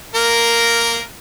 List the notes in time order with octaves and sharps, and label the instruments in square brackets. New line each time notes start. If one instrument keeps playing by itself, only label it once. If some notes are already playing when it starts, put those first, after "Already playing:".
[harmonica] A#3 A#4